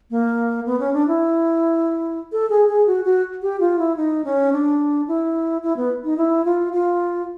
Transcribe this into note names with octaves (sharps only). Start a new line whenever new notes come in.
A#3
B3
C#4
D4
E4
A4
G#4
G#4
F#4
F#4
G4
F4
E4
D#4
C#4
D4
E4
E4
B3
D#4
E4
F4
F4